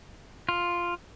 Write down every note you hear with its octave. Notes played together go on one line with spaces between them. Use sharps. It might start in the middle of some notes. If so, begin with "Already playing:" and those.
F4